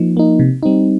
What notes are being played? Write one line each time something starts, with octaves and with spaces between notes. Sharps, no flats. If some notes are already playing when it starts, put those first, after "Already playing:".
Already playing: F3 A#3 D#4
A#3 D#4
C3
G3 C4 D#4